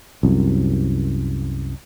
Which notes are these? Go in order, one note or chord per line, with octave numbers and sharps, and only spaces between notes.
C2 F#2